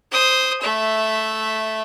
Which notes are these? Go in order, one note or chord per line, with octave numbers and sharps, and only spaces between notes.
C5 D#6
A3 E5